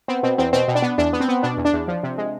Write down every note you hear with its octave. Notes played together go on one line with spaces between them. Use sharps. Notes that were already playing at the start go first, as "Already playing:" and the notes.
B3 C4
B2 C4
E2 C4
B2 C4
B2
D4
B3
E2 D4
B3
C4
B3
B2 D4
E2
D4
E2
F3
C3
G#3